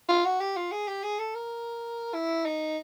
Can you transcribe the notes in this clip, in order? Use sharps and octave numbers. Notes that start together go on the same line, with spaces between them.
F4
F#4
G4
F4
G#4
G4
G#4
A4
A#4
E4
D#4